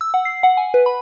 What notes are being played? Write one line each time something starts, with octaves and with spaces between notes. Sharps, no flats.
E6
F#5
C7
F#5
G#5
B4
B5